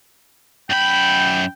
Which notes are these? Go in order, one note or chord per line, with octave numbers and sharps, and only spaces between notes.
F#2 G5 B5